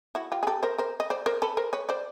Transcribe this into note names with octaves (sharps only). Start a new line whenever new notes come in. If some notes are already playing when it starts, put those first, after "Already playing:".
E4 F#4
F4 G4
G#4
G4 A4
A#4 C5
A#4 C5
D#5
C5 D5
A#4 C5
A4 B4
A#4 C5
B4 C#5
C5 D5